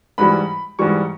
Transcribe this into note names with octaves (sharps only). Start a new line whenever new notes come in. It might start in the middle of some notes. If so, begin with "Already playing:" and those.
G#2 E3 G3 B5
G#2 E3 G3 C#6